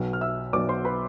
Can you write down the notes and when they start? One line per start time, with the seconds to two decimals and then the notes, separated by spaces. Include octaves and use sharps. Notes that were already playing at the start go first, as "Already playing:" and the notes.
Already playing: B1 B2 B3
0.13 F6
0.21 E5 E6
0.53 B1 B2 B3 D5 D6
0.69 C5 C6
0.85 B4 B5